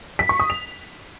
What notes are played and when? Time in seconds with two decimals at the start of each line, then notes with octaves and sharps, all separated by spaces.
0.19 B6
0.29 C#6
0.40 D#6
0.50 F7